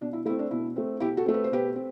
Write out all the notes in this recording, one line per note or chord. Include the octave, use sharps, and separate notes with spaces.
B2 D4
E4
A3 C4 E4
D4
B2 E4
A3 C4
B2 E4 G4
F#4 A4
A3 C4
B4
C5
B2 G4 B4
C4